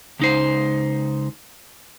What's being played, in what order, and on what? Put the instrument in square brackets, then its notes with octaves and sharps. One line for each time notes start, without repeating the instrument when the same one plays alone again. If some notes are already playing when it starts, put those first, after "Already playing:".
[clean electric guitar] C#2 D#4 C5